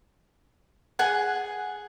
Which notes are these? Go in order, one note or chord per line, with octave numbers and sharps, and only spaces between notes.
G#4 F#5 G#5